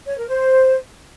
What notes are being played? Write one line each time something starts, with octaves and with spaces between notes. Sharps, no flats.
C#5
A#4
C5